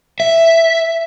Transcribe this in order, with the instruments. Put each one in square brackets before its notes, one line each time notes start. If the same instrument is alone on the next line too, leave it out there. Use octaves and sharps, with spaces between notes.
[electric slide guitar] E5